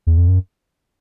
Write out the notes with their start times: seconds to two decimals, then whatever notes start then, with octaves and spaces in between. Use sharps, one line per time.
0.07 E2
0.18 F2
0.28 F#2